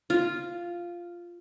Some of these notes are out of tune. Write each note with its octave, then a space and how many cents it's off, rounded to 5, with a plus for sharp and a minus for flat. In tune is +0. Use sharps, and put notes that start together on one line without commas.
F4 -5